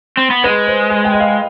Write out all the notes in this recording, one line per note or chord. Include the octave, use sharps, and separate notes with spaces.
C4
B3
G#3 B4
C5
G#5
G5
D#5
F5